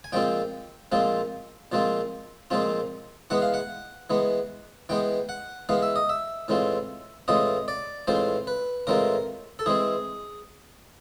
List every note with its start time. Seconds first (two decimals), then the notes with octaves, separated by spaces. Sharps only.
0.04 G#5
0.12 A#2 F3 G#3 C4 F4 G5
0.92 A#2 F3 G#3 C4 F4
1.72 A#2 F3 G#3 C4 F4
2.51 A#2 F3 G#3 C4 F4
3.30 E3 G#3 B3 F#5
3.42 F5
3.54 F#5
4.10 E3 G#3 B3
4.89 E3 G#3 B3 G5
5.29 F#5
5.69 E3 G#3 B3 F5
5.82 E5
5.96 D#5
6.09 E5
6.48 A2 E3 G#3 C4 F4
7.28 A2 E3 G#3 C4 F4 D#5
7.68 D5
8.07 A2 E3 G#3 C4 F4 C5
8.47 B4
8.87 A2 E3 G#3 C4 F4 A#4
9.59 A4
9.66 E3 G#3 C4 G#4